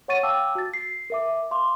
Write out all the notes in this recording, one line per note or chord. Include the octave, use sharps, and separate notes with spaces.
C#5 F#5 C#6 A6 D#7
F5 G5 A5 D6 E6
F#4 A6
C7
A#4 E5 D6
F5 C6 D6